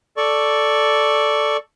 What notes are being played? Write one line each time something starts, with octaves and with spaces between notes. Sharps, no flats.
A4 D5 C#6